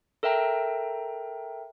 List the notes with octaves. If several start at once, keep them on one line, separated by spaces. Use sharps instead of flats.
A4 A#4 E5 G5 A#5